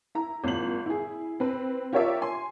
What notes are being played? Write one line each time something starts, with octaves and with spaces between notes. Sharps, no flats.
E4 A#5
G#1 A#2 F#7
E4 G#4
C4 B4
F4 G4 A#4 C#5 D5 E5
G#5 C6